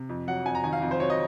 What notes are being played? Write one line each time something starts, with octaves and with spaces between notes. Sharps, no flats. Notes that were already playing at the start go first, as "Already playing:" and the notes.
Already playing: C3
F2
F#3 F#5
F2 G#5
A#5
D#3 G#5
F5
F2
C5
F#3 C#5
D#5